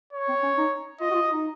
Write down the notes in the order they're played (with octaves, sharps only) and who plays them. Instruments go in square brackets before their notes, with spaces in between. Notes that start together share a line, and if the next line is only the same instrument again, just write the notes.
[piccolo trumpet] C#5
[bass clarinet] C4
C#4
D#4
[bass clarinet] F4 [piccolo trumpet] D#5
[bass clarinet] F#4
F4
D#4